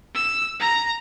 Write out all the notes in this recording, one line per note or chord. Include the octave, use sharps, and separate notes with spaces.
E6
A#5